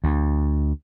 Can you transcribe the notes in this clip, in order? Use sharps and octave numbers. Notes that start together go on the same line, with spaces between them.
D2